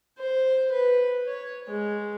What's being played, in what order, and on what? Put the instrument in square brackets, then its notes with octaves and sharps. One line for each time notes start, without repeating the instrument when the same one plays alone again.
[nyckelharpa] C5
B4
C#5
G#3